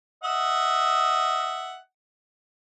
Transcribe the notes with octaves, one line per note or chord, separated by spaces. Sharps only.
D#5 E5 F#5